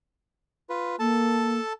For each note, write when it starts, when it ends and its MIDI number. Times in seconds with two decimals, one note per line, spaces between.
0.69 0.96 65
0.69 0.96 71
0.99 1.59 58
0.99 1.73 69
0.99 1.73 81